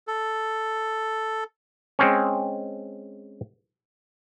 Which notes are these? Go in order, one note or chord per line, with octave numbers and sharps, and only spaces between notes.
A4
G#3 C4 C#4